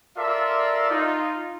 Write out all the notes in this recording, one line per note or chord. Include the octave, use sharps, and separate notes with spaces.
F4 A4 A#4 D5 E5 C6
D#4 F4